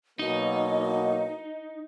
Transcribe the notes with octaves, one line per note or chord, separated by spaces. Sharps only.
B2 F#3 A#3 D#4 D#5